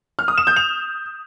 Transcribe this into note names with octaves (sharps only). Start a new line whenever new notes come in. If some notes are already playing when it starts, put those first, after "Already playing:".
F6
D#6
E7
G6
F7